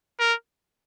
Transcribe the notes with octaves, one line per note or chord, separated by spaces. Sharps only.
A#4